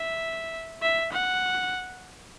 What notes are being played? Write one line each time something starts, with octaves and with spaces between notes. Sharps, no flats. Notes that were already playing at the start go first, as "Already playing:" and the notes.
Already playing: E5
E5
F#5